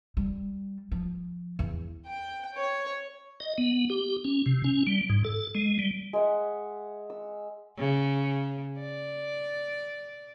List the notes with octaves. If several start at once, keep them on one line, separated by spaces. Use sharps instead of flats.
G3
F3
E2
G5
C#5
D#5
B3
G4
C#4
C3
C#4
G3
G#2
A4
G#3
G3
G#3 E5 F#5
E6
C#3
D5